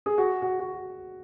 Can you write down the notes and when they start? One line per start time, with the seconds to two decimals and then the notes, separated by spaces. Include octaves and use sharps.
0.06 G#4
0.18 F#4
0.42 F#4
0.59 F#4